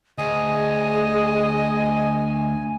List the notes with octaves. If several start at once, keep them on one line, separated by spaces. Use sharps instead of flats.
D2 G#4 D#5 G#5